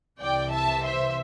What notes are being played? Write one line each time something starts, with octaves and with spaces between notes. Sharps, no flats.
C2 C3 E3 D5 G5
E5 A5
C5 E5